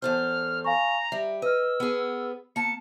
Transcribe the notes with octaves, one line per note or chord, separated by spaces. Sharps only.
E2 A4 C5 F6
F5 G#5 A#5 C#6
G3 E5
B4 D#5 E6 F6
B3 G#4
A#3 A5 C#7